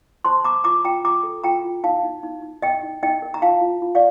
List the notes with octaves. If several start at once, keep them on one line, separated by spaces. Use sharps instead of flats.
C5 A5 C6
C5 A#5 D6
F4 A#5 D6
F4 G5 A#5
F4 A#5 D6
A4
F4 G5 A#5
F4
D#4 F5 A5
D#4
D#4
D#4
A#4 D#5 G5
D#4
D#4 D#5 G5
A#4
A#5
F4 F5 A5
F4
F4
D5 F5